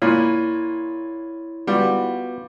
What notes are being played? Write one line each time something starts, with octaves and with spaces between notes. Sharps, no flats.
A#2 E4 C#5
G3 B3 F4 F#4